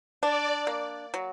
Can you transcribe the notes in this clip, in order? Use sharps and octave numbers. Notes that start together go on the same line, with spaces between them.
D4 D5
A#3
F#3